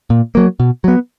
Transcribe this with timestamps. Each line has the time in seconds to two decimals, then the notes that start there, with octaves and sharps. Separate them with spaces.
0.10 A#2
0.35 F#3 A#3
0.60 B2
0.84 F#3 B3